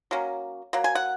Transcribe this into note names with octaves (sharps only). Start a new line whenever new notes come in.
F#3 A#3 C#4
F#3 A#3
G#5
F#5